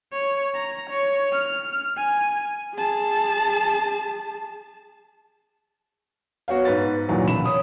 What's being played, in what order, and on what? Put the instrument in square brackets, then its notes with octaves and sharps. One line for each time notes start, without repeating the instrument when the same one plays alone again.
[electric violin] C#5
A#5
C#5
F6
G#5
[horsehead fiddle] G#4 A5
[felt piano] B3 F#4 C#5 F5
G#2 B4 A6
D#2 A#2 E3 F#3
E1 C#3 B5 E7
C#5 D#6